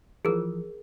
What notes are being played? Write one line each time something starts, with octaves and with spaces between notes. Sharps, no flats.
E3 F3 G#4 A#4